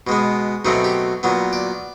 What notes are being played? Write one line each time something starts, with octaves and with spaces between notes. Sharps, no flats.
B2 G#3 B3
B2 F#3 A3 C4 D#4
G4
A#2 F#3 B3
D5